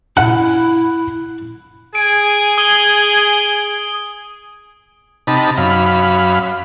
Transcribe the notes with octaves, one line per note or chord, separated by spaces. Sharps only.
E4 F#5 F#6
G#4 G#5 D7
D#6 G7
C3 D#4 A5 B5
F#2 F5 B5